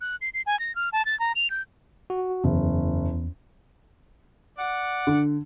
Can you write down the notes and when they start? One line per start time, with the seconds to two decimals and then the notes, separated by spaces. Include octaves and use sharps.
0.01 F#6
0.21 C7
0.34 C7
0.46 G#5
0.60 A#6
0.75 F6
0.93 A5
1.05 A6
1.20 A#5
1.35 F7
1.50 G6
2.10 F#4
2.44 F#1 E2
4.58 D5 F#5
5.07 D3